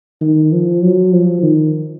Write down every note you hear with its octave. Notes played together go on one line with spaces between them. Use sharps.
D#3
F3
F#3
F3
D#3